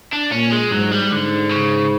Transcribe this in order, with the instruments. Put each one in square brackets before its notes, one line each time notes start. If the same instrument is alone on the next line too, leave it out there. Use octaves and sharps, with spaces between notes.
[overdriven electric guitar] D4
[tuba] A#2 [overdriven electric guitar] C#4
[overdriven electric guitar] G#3
[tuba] G#2 [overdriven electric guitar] F#3
[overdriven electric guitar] G3
[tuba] G#2 [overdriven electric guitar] D3
[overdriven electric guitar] C#3